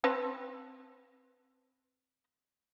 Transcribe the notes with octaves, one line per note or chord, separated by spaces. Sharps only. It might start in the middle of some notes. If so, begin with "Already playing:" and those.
C4 B4 A5